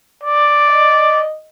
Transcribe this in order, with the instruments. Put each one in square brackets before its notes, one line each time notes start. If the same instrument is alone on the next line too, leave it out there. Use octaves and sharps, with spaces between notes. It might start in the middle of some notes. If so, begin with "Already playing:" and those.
[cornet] D5
[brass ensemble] D#5